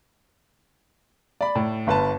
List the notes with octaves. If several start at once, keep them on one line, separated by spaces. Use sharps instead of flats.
D5 B5
A2
G1 B4 A5